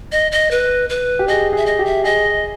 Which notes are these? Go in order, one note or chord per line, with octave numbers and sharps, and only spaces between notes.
D#5
D#5
B4
B4
G4
G#4 D#5
G#4 E5
D#5
G4
E5
G#4 D#5